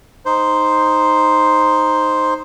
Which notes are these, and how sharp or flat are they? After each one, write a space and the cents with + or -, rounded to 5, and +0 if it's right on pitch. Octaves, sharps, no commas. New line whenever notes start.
D#4 +0 C5 +0